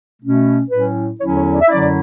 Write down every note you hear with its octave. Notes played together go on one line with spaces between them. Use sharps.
B2 A3 C#4
A2 F#3 C#4 E4 B4
E2 D3 F#3 C#4 E4 C#5
C#5
D5
E5
F#2 D3 F#3 C#4 E4 D5